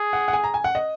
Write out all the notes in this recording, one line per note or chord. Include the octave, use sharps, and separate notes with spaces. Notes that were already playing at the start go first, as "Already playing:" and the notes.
Already playing: G#4
F#5
F#5
G#5
A#5
G#5
F#5
D#5